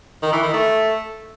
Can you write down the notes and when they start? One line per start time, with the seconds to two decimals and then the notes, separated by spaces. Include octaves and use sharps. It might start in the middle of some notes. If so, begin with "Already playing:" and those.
0.23 D#3
0.33 E3
0.43 D#3
0.53 A3